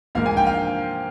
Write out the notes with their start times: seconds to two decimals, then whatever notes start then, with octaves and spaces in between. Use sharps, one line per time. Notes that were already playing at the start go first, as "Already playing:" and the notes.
0.15 G#2 F3 A#3 F5
0.26 G#5
0.37 G5
0.47 F5